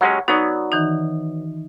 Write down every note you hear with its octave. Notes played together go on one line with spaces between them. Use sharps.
F#3 G#3 C#4 G4 C#5 F#5
F#3 B3 D#4 F#4 D5
D#3 E3 D#4